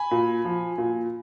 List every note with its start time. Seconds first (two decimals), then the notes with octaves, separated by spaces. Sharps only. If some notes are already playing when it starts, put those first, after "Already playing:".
Already playing: G#5 B5
0.11 A#2
0.45 F3
0.78 A#2